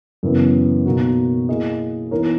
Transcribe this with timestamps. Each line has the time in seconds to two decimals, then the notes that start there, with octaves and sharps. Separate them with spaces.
0.23 F#2 C#3 E3 B3
0.86 B2 A#3 D#4 F#4
1.49 A#3 E4 G#4 D#5
2.11 E3 B3 D#4 A#4 C#5